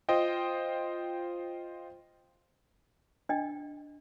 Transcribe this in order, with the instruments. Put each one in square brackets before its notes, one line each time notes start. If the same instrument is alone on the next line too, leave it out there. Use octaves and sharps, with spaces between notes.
[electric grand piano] F4 C5 D#5 G5
[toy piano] D4 D#5 G5